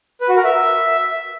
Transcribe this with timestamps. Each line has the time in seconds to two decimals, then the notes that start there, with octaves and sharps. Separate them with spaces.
0.21 B4
0.29 F#4
0.37 A#4
0.44 E5